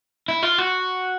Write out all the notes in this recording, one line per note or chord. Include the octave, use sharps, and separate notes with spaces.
E4
F4
F#4